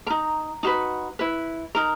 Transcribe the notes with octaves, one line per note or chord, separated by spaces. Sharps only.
D#4 A#4 A#5
D#4 F#4 B4
E4 B4
D#4 A#4